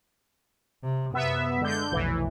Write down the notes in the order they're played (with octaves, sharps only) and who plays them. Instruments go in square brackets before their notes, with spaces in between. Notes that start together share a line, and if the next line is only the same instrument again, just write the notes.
[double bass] C3
[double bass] F#2 C3 [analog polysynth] B3 E5
[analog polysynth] D3 G6 [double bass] G#3
[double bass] F1 B1 [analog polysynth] E3